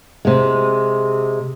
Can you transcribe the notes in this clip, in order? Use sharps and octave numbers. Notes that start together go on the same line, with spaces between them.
C3 G#3